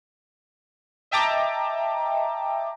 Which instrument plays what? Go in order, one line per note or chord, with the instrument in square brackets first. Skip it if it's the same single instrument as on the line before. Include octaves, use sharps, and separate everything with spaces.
[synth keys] D#5 E5 G5 A5 A#5 D6